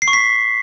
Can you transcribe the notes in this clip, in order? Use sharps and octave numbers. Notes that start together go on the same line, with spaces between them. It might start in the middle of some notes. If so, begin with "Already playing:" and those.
C7
C#6
B6